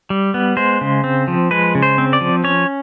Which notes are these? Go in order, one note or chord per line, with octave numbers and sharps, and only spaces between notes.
G3
B3
G#3 C5
C#3
C4
F3
G#3 B4
C#3
C5
C4
D5
F3
C#4 C#5